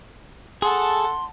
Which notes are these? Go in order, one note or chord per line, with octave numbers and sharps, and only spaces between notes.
G#4 A4 F#5 A5 C6